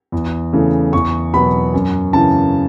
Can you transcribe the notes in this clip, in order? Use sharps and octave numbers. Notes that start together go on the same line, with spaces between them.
E2
C#3 E3 A3
E2 C#6
B2 F#3 B3 B5
F#2
C#3 E3 A5